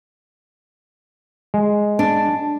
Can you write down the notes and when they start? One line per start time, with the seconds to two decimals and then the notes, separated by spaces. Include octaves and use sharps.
1.54 G#3
1.99 D4